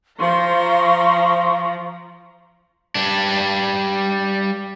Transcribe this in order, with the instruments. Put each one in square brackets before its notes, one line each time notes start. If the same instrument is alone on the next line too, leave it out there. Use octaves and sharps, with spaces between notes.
[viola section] F3 A#5 [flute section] C6 C#6
[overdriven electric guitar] G3 D4